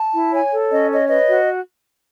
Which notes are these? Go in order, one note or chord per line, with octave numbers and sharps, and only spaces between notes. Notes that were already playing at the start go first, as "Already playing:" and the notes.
Already playing: A5
E4
C#5 G#5
A4
C#4 D#5
C#5 D#5
B4 D#5
F#4